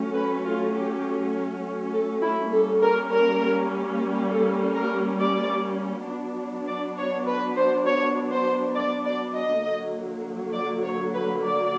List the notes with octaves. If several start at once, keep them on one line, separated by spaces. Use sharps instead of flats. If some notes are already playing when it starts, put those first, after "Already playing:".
Already playing: F#3 A3 C#4
B4
F4
G4
A4
E4
G3 A#3 C#4 A4
A#4
A#4
A4
A#4
D5
F#3 B3 D4
D5
C#5
B4
C5
C#5
C5
D5
D5
D#5
D3 F#3 A#3
D5
C#5
B4
D5